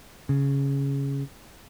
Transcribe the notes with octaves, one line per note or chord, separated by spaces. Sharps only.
C#3